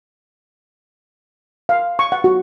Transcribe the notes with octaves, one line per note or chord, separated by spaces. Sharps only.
F5
C#6
F#5
F#4